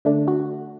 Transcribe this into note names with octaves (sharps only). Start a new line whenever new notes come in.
D3 A3 D4
F#4